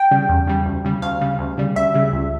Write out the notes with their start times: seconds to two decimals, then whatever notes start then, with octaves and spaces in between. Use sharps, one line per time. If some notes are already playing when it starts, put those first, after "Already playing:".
Already playing: G5
0.11 C#3 G3
0.29 E2
0.47 C#3 G3
0.66 D2
0.85 C#3 G3
1.02 D2 F5
1.21 C#3 G3
1.39 D2
1.57 C#3 G3
1.76 D2 E5
1.94 C#3 G3
2.13 C#2